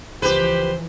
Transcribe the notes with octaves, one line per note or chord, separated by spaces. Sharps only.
C#2 E3 F3 G4 B4 C5